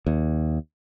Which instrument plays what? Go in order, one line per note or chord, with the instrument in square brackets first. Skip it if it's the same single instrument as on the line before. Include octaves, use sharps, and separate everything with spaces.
[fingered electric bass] D#2